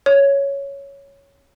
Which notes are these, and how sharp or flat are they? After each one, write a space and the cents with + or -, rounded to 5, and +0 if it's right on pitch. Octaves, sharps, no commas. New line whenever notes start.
C#5 +5